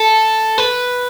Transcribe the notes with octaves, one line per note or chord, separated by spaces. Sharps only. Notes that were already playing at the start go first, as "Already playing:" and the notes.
Already playing: A4
B4